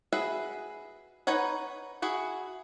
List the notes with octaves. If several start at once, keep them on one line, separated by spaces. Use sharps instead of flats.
F#4 G#4 B4 E5
D#4 B4 C#5 F#5 A#5
E4 F#4 G#4